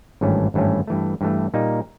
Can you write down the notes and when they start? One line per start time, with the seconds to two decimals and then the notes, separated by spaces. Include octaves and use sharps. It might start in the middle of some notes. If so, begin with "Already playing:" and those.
0.21 G#1 G2 E3 A3 C#4
0.54 G#1 G2 E3 A3 C#4
0.87 G2 E3 A3
1.21 G2 E3 A3
1.54 A#2 G3 A#3 D#4